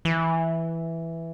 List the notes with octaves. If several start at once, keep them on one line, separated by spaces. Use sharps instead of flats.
E3